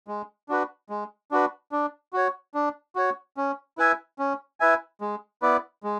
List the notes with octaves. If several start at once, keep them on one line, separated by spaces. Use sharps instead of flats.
G#3
D4 F#4 B4
G#3
D4 F#4 B4
D4
F#4 C#5
D4
F#4 C#5
C#4
E4 B4 E5 G#5
C#4
E4 B4 E5 G#5
G#3
B3 E4 B4 D5
G#3